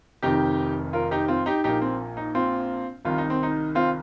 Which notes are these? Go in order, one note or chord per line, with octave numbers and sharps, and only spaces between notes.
F1 F2 C3 D#3 D#4 G4
F4 A#4
D#4 G4
C4 F4
D#4 G4
A#1 A#2 A#3 D#4 G4
C4
D#4
C4 F4
C2 C3 D#3 F4
D#4
C4
D#4
C4 F4